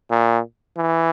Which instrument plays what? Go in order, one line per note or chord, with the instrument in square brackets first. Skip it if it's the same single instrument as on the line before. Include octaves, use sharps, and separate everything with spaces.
[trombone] A#2
E3